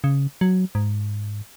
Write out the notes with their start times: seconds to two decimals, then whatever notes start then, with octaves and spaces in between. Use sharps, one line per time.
0.04 C#3
0.41 F#3
0.75 G#2